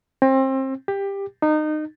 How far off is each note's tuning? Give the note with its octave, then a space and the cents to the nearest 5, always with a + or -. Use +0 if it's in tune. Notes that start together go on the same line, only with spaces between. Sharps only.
C4 +30
G4 +15
D#4 -25